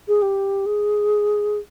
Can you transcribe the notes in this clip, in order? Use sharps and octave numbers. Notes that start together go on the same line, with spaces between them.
G#4
G4
G#4